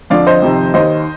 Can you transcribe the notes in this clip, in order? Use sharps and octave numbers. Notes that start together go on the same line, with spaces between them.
F2 D3 F3 D5 F5
C5 D#5
F2 C3 D#3
D#2 D#3 C5 D#5